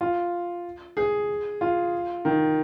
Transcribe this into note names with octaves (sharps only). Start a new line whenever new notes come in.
F4
G#4
F4
D#3